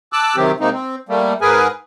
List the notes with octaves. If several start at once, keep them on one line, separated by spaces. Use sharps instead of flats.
A5 D6 E6 F#6
C3 D#3 F#3 C4 G4
C3 G#3 A#3 C4 D#4
C4
G3 A3 A#3
G#2 G#4 A#4 B4 G#5